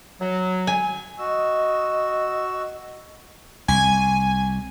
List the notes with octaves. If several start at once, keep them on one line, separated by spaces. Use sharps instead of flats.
F#3
G#5
F#4 D#5 E6
C2 G#5